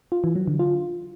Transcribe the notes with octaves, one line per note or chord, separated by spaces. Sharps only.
F4
E3
F#3
D3
F4